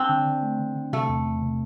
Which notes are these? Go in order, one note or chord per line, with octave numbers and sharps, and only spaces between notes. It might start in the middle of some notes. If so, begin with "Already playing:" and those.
Already playing: C4 D4
D3
D3
A3
D3
D3
C3 A3
E2
E2
C3